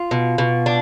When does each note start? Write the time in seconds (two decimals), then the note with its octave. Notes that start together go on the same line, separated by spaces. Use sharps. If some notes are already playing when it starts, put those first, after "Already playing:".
Already playing: F4
0.11 B2
0.38 B2
0.66 D4